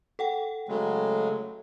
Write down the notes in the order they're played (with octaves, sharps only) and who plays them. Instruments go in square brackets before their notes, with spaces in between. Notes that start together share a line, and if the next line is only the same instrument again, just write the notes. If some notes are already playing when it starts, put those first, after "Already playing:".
[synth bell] A4 F#5 G5
[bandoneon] C#3 F#3 G#3 [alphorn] A3